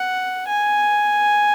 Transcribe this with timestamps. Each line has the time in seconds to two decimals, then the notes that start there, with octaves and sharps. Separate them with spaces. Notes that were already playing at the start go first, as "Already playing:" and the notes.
Already playing: F#5
0.48 G#5